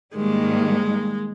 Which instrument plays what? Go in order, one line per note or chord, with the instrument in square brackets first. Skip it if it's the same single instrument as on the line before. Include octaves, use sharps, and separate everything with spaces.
[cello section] G#2 D#3 G3 A#3 [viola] G#3